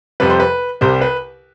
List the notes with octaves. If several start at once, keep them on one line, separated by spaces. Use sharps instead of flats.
F2 C3 G3 B4
C5
B4
C2 C3 G3 C5
B4